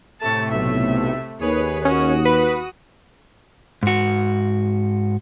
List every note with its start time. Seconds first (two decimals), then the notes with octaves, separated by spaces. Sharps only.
0.21 A2 C3 A3 A5 C#6
0.52 B1 E5
1.41 D#2 G#4 B4 C#5
1.85 C#4 F#4 D#6
2.25 B4
3.83 G#2 F#4